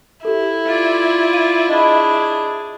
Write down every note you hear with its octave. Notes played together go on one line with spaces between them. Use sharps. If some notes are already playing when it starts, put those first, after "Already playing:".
E4 G4 A4
F4 D5
F5 D#7
D4 G#4 D#5 B5